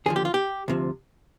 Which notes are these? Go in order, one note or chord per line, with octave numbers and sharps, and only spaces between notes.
D#2 D3 F3 G#4
G4
F4
G4
D2 C3 F3